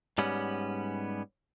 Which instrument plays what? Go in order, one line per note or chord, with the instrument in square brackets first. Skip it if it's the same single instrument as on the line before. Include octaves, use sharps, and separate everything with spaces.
[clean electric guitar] G#2 G3 B3 C#4